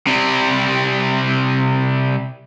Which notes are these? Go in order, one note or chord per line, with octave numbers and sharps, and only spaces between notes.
C3 G3